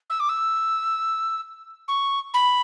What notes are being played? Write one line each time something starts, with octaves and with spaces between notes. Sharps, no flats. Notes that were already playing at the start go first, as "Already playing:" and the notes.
E6
D6
E6
C#6
B5